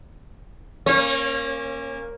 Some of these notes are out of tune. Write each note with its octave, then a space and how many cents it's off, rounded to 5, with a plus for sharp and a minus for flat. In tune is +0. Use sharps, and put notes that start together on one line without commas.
A#3 +0 C#4 -25 C#5 -40